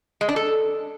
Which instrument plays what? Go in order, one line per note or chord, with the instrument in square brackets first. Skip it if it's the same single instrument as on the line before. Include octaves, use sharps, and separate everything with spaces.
[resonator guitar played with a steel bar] G#3
D4
A4